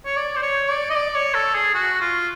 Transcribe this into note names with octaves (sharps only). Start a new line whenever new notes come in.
C#5
D5
C5
C#5
D5
D#5
D5
C#5
A4
G#4
F#4
F4